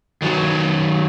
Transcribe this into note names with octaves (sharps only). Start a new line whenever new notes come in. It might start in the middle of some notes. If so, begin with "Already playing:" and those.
D#3 F#3 F#4